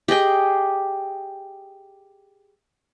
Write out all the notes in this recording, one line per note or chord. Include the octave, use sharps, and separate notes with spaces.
G4 G#4 D#5 G5